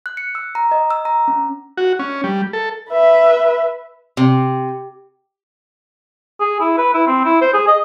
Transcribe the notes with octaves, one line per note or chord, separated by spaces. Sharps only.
F#6
C#7
E6
A#5
D#5
E6
A#5
C#4
F#4
C#4
G3
A4
B4 E5
C3
G#4
E4
B4
E4
C4
E4
C5
G#4
D#5